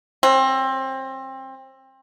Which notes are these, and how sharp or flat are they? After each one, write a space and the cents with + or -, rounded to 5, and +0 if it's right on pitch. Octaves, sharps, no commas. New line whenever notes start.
F#3 +10 C4 +25